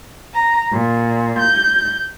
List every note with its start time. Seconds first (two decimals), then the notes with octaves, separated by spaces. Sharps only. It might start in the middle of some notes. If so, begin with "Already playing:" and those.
0.34 A#5
0.71 A#2
1.37 G6